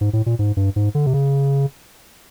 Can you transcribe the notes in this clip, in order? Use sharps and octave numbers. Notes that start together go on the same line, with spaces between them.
G#2
A2
A#2
G#2
G2
G#2
D3
C3
C#3